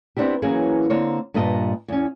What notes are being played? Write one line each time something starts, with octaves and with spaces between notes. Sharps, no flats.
B3 C4 D4 E4 G4
E3 F#3 A#3 B3 C#4 G#4
D3 A#3 C4 A#4 C#5
G2 A#2 B4 D#5 G#5 A5
E2 C#4